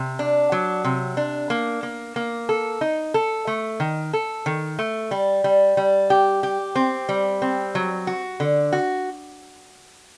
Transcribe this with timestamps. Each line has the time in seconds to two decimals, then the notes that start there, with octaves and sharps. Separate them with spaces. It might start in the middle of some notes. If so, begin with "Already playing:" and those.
Already playing: C3
0.19 D4
0.52 F#3
0.84 C3
1.17 D4
1.50 A#3
1.83 A#3
2.16 A#3
2.49 A4
2.81 D#4
3.14 A4
3.47 A3
3.80 D#3
4.13 A4
4.46 D#3
4.79 A3
5.11 G3
5.44 G3
5.77 G3
6.10 G4
6.43 G4
6.75 C4
7.09 G3
7.42 C4
7.75 F#3
8.07 F#4
8.40 D3
8.73 F#4